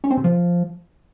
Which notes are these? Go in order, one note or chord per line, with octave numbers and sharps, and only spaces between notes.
C#4
C4
C3
F3